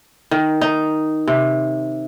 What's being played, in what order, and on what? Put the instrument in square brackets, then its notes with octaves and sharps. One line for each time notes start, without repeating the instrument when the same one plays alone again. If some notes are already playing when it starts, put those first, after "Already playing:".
[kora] D#3
D#4
C3